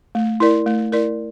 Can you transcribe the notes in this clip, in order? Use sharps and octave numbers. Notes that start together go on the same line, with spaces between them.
A3
E4 A#4 D5
A3
E4 A#4 D5